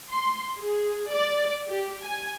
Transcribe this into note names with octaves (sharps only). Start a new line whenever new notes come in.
C6
G#4
D5
G4
G#5